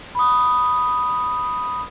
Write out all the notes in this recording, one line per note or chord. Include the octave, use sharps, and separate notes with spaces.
B5 D#6